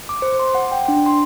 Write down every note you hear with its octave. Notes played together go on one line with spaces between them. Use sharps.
D6
C5
C6
F#5
G5
D4
C6